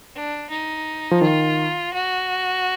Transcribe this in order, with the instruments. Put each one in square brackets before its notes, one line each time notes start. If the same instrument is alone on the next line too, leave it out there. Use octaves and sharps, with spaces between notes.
[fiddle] D4
D#4
[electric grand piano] F3
[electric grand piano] D#3 [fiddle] F4
[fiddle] F#4